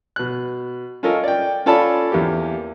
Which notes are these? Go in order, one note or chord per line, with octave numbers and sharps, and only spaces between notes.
B2 F#6
C#4 F4 A4 A#4 D#5
D5 G5
C#4 F4 A4 D5 A5 B5
E2 A#3 G4